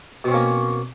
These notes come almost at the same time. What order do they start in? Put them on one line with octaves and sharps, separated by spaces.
B2 C4 C#4 A#3